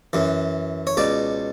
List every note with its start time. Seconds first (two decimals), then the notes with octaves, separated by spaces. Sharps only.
0.13 F#2 E3
0.87 C#5
0.97 C#2 B2 D5